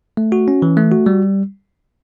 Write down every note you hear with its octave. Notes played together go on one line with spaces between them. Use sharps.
A3
F#4
C#4
E3
A3
F#4
G3